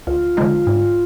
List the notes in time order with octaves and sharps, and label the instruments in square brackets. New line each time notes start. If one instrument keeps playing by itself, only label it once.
[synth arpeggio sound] D2 [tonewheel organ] F4
[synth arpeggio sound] D3 F3 G#3 D#4
G#2